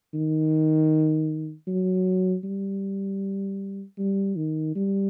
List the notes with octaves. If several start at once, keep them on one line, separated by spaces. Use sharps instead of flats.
D#3
F#3
G3
G3
D#3
G3